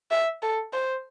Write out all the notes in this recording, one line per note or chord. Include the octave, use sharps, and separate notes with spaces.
E5
A4
C5